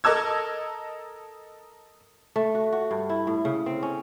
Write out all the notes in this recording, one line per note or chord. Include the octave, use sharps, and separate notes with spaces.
A4 A#4 D#5 A5 E6 G#6
A3
F#4
F#4
G2
E4
A2
C#3
C4
C#4